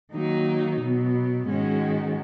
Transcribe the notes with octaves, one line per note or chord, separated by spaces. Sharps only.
D#3 F#3 A#3 D#4
B2 F#3 B3
G#2 D#3 G#3 C#4 F#4